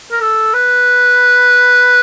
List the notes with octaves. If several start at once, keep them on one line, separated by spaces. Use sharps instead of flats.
A#4
A4
B4